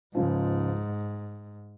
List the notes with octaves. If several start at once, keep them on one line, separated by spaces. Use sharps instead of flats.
C#2 G#2 C#3 F3